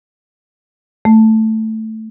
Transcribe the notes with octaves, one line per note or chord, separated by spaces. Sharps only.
A3